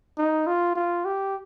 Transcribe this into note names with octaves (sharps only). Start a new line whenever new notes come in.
D#4
F4
F4
G4